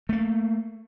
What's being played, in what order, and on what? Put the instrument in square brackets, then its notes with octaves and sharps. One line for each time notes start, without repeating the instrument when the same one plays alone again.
[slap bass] A3 A#3